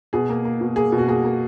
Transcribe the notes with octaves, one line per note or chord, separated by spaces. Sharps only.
B2 G#4
A#3
A#3
B2
A#3 G#4
B2
F#4
A#3 G#4
A#3